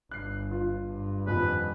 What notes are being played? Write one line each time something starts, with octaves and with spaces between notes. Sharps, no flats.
G1 F#6 C7
F4
G2
D#1 F2 B4